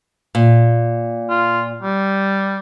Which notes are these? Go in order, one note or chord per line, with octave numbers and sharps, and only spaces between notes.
A#2
F4
G3